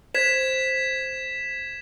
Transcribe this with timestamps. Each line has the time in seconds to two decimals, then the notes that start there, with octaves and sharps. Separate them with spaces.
0.15 C5 G#6 B6 E7